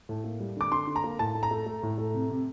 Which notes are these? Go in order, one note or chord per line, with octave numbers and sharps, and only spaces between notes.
A2
A#3
G3
D3 D6
D3 C6
D3
A#5
A#3
A2 A5
A3
A#5
A3
A3
A2
A3
C3
C3